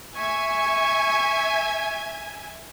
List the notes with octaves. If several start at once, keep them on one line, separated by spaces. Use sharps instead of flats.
E5 G#5 C#6 G#6